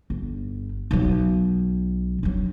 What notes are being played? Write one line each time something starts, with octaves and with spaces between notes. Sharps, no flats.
G1
B1 F#3
G2 F#3